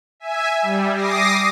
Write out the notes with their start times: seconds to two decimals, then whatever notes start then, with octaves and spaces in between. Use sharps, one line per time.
0.20 E5 G#5
0.62 G3
0.94 D6 D#6 A#6 C7